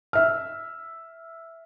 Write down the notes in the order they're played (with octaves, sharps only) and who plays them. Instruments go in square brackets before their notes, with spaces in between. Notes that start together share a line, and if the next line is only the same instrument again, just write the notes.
[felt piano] E5 F6